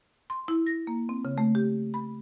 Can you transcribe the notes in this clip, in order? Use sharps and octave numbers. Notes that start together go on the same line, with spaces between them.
C6
E4
A#6
A#3
C4
C#3
A3
G4
B5